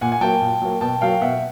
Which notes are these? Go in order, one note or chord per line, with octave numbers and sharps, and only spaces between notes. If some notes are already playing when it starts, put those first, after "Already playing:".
A#2 F#5 G#5
G#5
F#3 A#3 G5 A5
A#2
F#3 A#3
B2 G5 A5
F#3 A#3 F5 G5
B2 E5 F#5